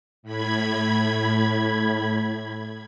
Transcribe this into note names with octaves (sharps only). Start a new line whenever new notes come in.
A2 B5 G#6